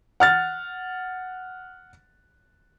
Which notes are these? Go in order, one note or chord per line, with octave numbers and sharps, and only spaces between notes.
F#5 F6 A6